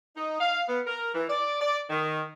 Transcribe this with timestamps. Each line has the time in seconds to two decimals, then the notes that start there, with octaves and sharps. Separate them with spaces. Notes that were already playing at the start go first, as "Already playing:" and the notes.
0.16 D#4
0.41 F5
0.68 B3
0.87 A#4
1.14 E3
1.28 D5
1.60 D5
1.90 D#3